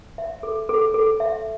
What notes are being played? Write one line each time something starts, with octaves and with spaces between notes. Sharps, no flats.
E5
A4
A4
A4
E5